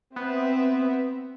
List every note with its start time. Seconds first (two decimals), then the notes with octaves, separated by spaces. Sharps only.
0.16 B3 C4 E5